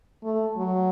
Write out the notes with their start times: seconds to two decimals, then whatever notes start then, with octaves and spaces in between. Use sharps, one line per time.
0.24 A3
0.57 F#3